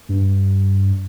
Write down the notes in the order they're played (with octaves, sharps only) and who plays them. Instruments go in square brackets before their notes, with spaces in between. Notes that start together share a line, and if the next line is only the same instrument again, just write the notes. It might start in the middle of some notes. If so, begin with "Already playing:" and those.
[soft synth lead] G2